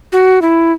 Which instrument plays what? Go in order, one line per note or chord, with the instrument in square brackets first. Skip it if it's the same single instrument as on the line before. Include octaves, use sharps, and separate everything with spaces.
[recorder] F#4
E4